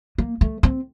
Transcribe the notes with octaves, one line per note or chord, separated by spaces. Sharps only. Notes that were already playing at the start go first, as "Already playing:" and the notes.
A#3
A3
C4